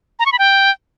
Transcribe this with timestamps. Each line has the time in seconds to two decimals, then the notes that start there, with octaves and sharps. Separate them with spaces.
0.19 A#5
0.26 C#6
0.32 B5
0.39 G5